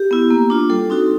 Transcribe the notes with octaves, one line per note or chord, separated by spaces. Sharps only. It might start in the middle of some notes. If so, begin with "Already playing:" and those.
Already playing: G4
B3 E4
A#3
D4 F4
G3 A4
C4 D#4 F#4